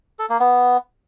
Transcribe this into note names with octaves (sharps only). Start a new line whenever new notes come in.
A4
A#3
B3